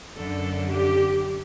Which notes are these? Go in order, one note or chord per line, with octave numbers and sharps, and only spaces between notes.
F#2 D3 A4
G4